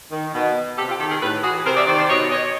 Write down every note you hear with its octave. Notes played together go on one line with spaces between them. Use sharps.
D#3
B2
C3 G4 A4
F4 G4
D#3 G4 A4
G#4 A#4
A2 A4 B4
E3 F#4 G#4
C3 A#4 C5
D5 E5
D#3 C5 D5
C5 D5
B2 C#5 D#5
C#5 D#5